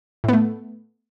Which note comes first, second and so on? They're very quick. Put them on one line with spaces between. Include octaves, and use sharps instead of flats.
A2 B3 A3